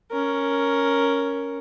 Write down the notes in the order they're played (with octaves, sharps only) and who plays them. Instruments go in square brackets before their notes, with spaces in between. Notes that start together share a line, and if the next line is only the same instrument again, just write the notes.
[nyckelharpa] C#4 A#4